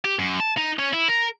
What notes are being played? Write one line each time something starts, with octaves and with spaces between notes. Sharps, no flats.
G4
F#2
A5
D#4
C#4
E4
A#4